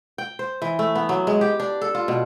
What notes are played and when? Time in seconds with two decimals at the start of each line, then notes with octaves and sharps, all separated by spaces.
0.18 G5
0.39 C5
0.62 E3
0.79 A3
0.95 B3
1.09 F#3
1.27 G#3
1.41 G4
1.60 D4
1.82 A4
1.95 F4
2.08 B2